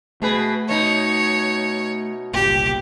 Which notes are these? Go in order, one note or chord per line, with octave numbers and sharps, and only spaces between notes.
B2 A3 G#4 B4
B2 D#4 C#5
F#1 C2 A#2 G4